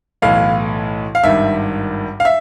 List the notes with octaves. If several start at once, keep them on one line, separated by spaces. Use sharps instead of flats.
B1 A2 E3 F5
F5
G#1 G2 D#3 E5
F5
E5